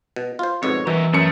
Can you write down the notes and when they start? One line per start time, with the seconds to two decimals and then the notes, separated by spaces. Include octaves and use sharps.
0.16 B2
0.39 F4 C5
0.63 F2 G#2 B2 C#5
0.87 B2 E3 A#4 E5
1.13 F#2 A3 C#7